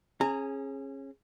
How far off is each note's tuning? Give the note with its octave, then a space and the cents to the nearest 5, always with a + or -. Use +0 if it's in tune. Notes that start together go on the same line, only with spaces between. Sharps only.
C#4 -30 G#4 +0 A#5 -25